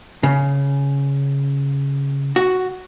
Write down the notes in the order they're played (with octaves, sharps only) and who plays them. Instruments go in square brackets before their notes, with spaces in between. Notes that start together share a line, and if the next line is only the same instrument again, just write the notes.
[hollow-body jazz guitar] C#3
F#4